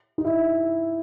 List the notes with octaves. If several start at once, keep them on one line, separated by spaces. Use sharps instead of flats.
D#4
E4